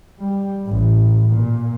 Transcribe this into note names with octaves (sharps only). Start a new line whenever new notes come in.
G3
A1
A#2